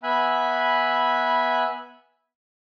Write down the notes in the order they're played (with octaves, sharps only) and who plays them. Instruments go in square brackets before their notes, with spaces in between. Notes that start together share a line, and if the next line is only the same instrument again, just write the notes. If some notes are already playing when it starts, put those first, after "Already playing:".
[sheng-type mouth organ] B3 E5 G#5 B5 F#6